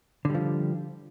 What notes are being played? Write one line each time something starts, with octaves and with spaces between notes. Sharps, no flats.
D3 F3 G3